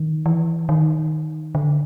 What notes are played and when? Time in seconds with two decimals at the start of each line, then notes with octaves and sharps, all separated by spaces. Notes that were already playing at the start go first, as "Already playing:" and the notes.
Already playing: D#3
0.26 E3
0.69 D#3
1.55 D3